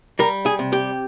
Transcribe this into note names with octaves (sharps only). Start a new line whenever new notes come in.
G3 A#4
G#4
C3
G4